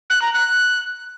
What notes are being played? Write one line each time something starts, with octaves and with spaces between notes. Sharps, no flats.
F#6
A#5
F#6